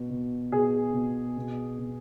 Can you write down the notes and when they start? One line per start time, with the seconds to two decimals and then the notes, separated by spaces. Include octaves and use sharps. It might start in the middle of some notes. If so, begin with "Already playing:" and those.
Already playing: B2
0.10 B2
0.52 B2 G#4
0.93 B2
1.37 B2
1.78 B2